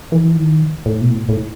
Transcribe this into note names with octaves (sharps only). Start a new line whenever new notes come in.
E3
D#3
A2
B2
A2
A2